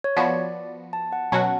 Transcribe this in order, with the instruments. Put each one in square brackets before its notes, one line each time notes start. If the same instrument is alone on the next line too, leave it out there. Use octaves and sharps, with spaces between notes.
[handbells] C#5
[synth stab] F3 B3 F#4 [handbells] D5
[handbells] A5
F#5
[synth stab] B2 F#3 C#4 F#4 [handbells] A5
[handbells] F#5